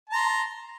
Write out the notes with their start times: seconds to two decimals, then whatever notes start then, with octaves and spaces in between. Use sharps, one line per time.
0.10 A5
0.12 A#5
0.15 C6